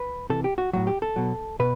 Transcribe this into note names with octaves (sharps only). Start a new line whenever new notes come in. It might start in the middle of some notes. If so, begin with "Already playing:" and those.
Already playing: B4
C3 E3 A4
G4
F#4
A2 F#3 F#4
G4
A4
B2 F#3
B2 B4